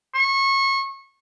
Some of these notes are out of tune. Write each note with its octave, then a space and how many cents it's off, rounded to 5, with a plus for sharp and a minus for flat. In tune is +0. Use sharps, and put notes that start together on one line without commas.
C#6 -30